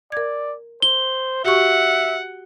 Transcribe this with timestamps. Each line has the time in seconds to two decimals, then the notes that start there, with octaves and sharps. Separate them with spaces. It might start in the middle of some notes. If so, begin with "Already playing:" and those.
0.12 A#4 D5 G#6
0.82 C5 G7
1.44 F#4 G4 E5 F#5 C#6